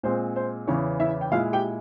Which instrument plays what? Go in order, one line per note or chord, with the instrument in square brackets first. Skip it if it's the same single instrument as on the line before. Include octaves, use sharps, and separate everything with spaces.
[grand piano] A#2 G#3 C4 [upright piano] C5
[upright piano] C5
[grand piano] E2 C#3 E3 [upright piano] C#4 C#5
[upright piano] E4 E5
G5
[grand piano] A#2 G#3 E4 [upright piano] F4 F5
[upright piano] G4 G5